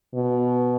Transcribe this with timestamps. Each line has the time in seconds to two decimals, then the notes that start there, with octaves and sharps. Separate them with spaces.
0.14 B2